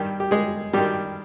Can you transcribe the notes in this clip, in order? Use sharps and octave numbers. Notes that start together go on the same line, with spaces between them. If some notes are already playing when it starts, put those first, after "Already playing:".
Already playing: G2 D#3 G3 G4
G4
G#3 G#4
G2 D#3 G3 G4